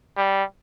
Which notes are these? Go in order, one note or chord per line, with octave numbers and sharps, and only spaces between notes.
G3